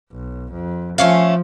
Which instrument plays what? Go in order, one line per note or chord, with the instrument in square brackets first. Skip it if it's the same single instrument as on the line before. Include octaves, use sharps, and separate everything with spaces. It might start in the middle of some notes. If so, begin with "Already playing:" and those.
[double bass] B1
F2
[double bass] F3 [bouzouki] A3 C#4 F5